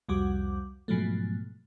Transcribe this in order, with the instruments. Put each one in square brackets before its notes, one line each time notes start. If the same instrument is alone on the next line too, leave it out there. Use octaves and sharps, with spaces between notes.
[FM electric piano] C2 F2 G3 F#4 F#5 D6
G#2 B2 F3 F#3 A3